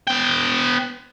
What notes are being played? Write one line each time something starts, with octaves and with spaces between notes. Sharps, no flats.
B3 G5